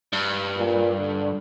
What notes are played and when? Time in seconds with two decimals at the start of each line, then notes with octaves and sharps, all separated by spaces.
0.13 G2
0.56 A#2
0.98 D3